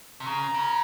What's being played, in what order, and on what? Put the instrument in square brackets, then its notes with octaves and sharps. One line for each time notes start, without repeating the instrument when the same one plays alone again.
[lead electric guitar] C3
[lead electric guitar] C#3 [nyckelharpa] A#5
[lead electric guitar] C#3